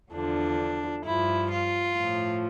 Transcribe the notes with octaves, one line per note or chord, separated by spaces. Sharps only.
E2 D3 F3 D4
G2 F3 E4
F4
A2 F3